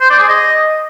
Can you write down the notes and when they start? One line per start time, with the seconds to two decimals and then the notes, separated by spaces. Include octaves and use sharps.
0.01 C5
0.10 D5
0.19 G#4
0.29 D#5